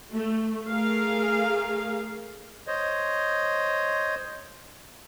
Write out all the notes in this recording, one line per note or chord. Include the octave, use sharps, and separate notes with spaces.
A3
A3 G#4 A#4 F5
C5 C#5 D#5